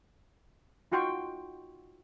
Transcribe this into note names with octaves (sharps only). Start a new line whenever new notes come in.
D#4 F4 F#4 G5 C6 C#6